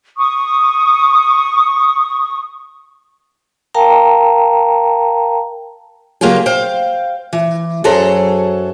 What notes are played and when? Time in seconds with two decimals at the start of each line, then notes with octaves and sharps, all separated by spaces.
0.17 C#6 D#6
3.75 A#4 F5 G5 A5 A#5
6.21 C#3 F#3 A#3 F4 G4 G#4
6.46 C5 F5 G5
7.33 E3
7.84 F#2 F#3 G#4 A4 C5 A#5